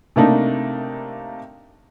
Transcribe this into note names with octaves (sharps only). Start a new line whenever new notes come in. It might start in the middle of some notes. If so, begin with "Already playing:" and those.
C3 A3 A#3 D4 D#4